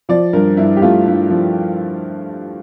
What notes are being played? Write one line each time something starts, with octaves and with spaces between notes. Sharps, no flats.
F3 D5
G2 A#4
G2 E4
G4
A3 F4
G2
F3